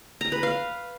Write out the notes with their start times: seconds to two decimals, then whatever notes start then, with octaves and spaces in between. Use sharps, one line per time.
0.21 A#5
0.32 B4
0.43 F5